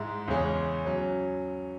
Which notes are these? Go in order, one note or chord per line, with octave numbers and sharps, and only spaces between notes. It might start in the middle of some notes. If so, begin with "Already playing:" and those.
Already playing: G#2 G#3 E4
E2 C#3 G#3 C#4
F#3 C#4